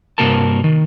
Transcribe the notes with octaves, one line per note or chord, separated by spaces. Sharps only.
G2 C3 A#3 F#4 A#4 A5
D#3